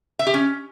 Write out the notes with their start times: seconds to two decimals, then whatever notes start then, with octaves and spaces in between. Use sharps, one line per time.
0.19 E5
0.27 G4
0.34 C#4